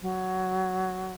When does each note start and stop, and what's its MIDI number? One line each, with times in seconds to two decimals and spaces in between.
0.02 1.14 54